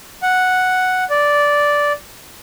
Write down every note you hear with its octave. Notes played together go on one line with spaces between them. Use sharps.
F#5
D5